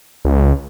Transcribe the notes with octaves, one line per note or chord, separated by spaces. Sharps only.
C#2